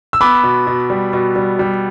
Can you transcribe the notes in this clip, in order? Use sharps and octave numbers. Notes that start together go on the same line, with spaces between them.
E6
B3 B5 D6
B2
B2
G3
B2
G3
G3